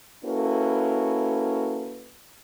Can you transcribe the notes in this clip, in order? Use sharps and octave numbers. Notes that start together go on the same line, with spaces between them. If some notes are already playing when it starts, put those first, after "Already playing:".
A#3 C#4 E4 F#4 A4 B4